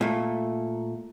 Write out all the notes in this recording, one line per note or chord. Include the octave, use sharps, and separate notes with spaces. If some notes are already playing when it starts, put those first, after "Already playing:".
A#2 A3